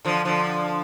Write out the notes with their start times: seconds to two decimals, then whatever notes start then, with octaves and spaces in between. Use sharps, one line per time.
0.05 D3 F3
0.25 D3 F3